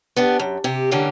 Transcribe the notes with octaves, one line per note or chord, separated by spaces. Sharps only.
B3 D4 G4
F#2
C3 G4
D3 E3 G3 A#3 C#4 G4